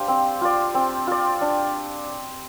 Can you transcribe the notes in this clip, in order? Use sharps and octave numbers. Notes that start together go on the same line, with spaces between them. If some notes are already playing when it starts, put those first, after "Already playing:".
Already playing: D4 G4 C5 F5
C4
F4 D5
C4
F4 D5
D4